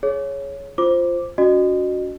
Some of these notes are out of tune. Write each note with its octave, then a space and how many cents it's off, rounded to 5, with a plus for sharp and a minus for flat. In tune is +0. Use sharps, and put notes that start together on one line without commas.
G#4 +15 C#5 +0
F4 -5 C5 +0 D6 +0
D4 -45 F#4 -5 D#5 -30